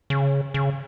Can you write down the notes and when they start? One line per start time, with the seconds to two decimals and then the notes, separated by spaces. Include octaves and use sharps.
0.10 C#3
0.54 C#3